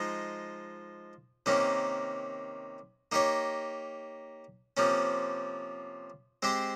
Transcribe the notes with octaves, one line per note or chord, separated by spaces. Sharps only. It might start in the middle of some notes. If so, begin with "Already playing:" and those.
Already playing: F3 G#3 D#4
C3 D#3 A#3 C#4
A#3 D#4 G4 C#5
C3 F3 A#3 C#4
G#3 C4 G4 C5